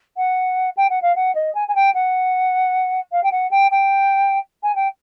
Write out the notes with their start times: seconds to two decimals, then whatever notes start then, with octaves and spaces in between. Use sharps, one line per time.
0.16 F#5
0.77 G5
0.89 F#5
1.02 F5
1.15 F#5
1.35 D#5
1.54 G#5
1.68 G#5
1.75 G5
1.94 F#5
3.11 F5
3.23 G5
3.31 F#5
3.51 G5
3.71 G5
4.63 G#5
4.75 G5